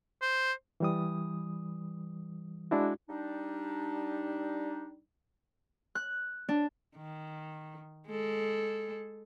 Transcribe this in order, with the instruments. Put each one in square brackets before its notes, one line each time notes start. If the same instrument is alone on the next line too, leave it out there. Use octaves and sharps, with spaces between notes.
[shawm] C5
[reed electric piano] E3 G3 D#6
G#3 D4 E4 F#4
[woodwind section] G3 D4 D#4
[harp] F#6
D4
[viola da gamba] D#3
G#3 A4